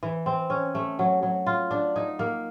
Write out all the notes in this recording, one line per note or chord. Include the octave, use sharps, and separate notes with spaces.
E3
C4
C#4
A3
F#3
F#3
F4
D4
D#4
A#3